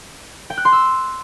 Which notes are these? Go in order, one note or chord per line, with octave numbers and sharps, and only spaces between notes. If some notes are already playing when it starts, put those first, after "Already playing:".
G5
F#6
C6
E6